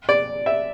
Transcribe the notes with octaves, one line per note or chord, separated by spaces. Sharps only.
D5
E5